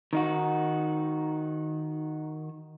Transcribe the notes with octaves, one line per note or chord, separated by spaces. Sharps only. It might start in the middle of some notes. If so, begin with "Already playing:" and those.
D#3 D#4 F#4